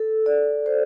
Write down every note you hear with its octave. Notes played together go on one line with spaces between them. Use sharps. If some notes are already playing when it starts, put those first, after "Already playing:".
Already playing: A4
D5
C5